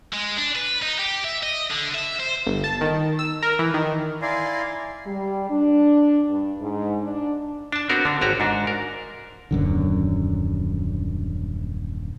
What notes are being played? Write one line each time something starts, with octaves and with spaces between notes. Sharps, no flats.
G#3
D4
B4
D#4
G4
E5
D#5
D3
E5
C5
G1
A5
D#3
E6
A#4
E3
D#3
E4 D5 F5 G#5 A#5 C6
G3
D4
G2
G#2
D4
D4 A5
B3 C4 D4 F#4 A#4
D3 D4
G#1 F#4 G4 C#5 A#5
G#2 D4 F#4
A#4
D#1 F#2 D3